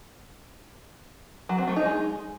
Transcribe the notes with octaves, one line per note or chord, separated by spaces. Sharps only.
F#3
C4
A3
D#4
G#3